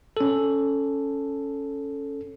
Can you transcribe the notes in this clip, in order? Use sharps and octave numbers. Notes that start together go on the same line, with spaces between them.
C#4 A4